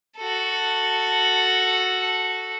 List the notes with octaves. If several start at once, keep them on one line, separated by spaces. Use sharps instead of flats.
F#4 A4